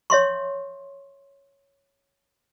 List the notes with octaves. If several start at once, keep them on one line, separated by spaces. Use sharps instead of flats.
C#5 E5 C6 C#6